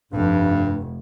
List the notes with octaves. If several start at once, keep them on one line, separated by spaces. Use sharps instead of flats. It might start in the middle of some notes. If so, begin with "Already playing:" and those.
F1 G2